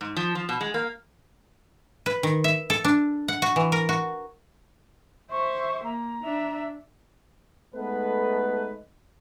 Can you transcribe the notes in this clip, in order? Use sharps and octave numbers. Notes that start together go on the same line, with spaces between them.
G#2
F3
F3
B2
G#3
A#3
B4
D#3
E5
A4
D4
F#5
F#4
E3
A#4
F#4
C5 E5 C#6
A#3 A#5
D4 E5
G#3 A3 B3 D#4 A4 B4